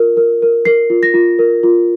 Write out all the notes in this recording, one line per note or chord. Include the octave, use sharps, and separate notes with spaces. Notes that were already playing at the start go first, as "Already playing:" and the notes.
Already playing: F4 A#4
A#4
A#4
A#4 C7
F4
A#6
F4
A#4
F4